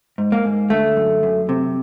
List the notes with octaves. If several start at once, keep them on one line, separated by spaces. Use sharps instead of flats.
G#2
A#3
G#2
D3 A3
F#2
F#2
C3